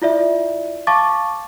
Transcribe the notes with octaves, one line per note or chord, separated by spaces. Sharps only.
E4 F4 D5 E5
F5 A5 C#6 D6 A6